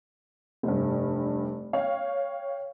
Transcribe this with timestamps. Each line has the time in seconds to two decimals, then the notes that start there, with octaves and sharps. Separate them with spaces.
0.63 F1 G2
1.73 C#5 F5 G5